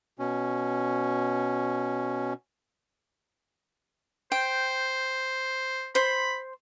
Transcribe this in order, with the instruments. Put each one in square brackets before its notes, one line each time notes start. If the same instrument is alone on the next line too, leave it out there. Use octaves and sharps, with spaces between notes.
[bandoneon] B2 C#4
[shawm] C5 [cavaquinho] G5
[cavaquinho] C5 C6 [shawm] B5